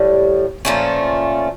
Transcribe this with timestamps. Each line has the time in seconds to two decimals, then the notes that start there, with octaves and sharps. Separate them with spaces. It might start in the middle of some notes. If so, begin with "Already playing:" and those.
Already playing: A2 G3
0.65 A#2 F3 A3 C#4